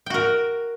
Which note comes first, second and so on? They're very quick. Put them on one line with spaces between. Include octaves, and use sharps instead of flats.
G5 F#4 A#4